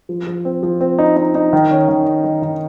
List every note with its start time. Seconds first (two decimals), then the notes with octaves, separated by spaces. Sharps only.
0.09 F3
0.27 F3
0.45 C4
0.63 F3
0.81 C4
0.98 D#4
1.17 D#4
1.35 D#4
1.53 D#3
1.71 C#4
1.89 D#3
2.07 C#4
2.24 D#3
2.43 D#3